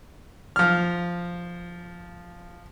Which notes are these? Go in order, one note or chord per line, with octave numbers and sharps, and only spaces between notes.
F3 F6